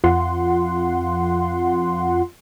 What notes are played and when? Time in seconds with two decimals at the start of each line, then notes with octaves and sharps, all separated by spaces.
0.04 F2 F4 F#5 C6